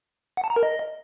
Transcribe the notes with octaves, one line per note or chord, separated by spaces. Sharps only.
F#5
A5
A#5
A#4
D#5